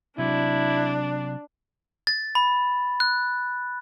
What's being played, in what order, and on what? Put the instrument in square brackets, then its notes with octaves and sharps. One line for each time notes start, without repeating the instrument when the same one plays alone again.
[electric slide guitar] C3 F#3 [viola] D4 [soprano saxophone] E4
[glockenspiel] A6
B5
F#6